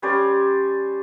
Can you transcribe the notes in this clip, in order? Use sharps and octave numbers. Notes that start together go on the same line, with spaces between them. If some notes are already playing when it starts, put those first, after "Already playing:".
G3 C#4 C5 D5